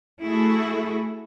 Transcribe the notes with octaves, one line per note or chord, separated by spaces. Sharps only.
A3 E4 F#4 G#4 A4